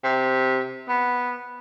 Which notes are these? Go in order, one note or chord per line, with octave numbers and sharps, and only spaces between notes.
C3
B3